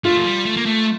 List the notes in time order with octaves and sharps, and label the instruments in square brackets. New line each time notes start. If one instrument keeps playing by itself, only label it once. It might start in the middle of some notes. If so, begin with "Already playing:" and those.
[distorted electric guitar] A3 [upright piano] F4
[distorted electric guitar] F3
G3
A3
A#3
A3